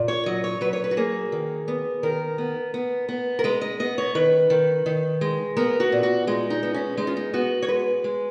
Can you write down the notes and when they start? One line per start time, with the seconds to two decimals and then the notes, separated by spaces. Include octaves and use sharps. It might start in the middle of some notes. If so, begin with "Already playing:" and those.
Already playing: A#2
0.08 C#5
0.26 F#3 D#5
0.44 C#5
0.61 F#3 B4
0.73 C#5
0.84 B4
0.91 F#4
0.97 A#3 G#4
1.32 D#3
1.68 B3
2.03 D#3 A#4
2.38 B3
2.74 B3
3.09 B3
3.39 A#4
3.44 G#3 B4
3.61 D#5
3.80 B3 D#5
3.98 C#5
4.15 D#3 B4
4.50 D#3
4.86 D#3
5.21 G#3
5.57 B3 A#4
5.80 F#4
5.92 A#2
6.03 F#4
6.27 G#3 D#4
6.50 D#4
6.63 B3
6.74 C#4
6.97 G#3 D#4
7.07 F4
7.17 D#4
7.34 B3 F#4
7.62 C#5
7.68 G#3 B4
8.04 G#3